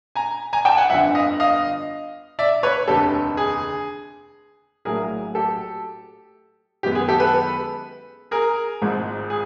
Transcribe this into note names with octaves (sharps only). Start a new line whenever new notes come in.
G#5 A#5
G#5 A#5
G5 A5
F#5 G#5
G1 F2 D3 E5 F#5
D#5 F5
D#5 F5
D5 E5
B4 C#5
F1 D#2 D3 G4 A4
G#4
A#1 A2 F#3 A3 G#4 A#4
G4 A4
F#2 D#3 G#3 B3 G4
G#4
G4 A4
A4 B4
G#4 A#4
G#1 G#2 F3 G#3
G#4